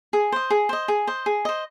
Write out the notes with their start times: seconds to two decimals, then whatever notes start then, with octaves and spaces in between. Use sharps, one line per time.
0.13 G#4
0.32 C5 D#5
0.50 G#4
0.69 C5 D#5
0.88 G#4
1.07 C5 D#5
1.26 G#4
1.45 C5 D#5